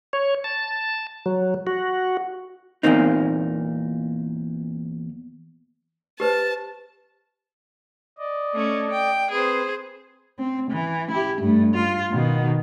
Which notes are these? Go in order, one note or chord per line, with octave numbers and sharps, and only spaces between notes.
C#5
A5
F#3
F#4
E2 G2 A#2 A#3 C4 D#4
G4 B4 C5 A5
D5 D#5
A3 C#4
G5
C4 G#4 B4 C5
C4
E3
E4 G4
G2 A3
F4
B2 D#3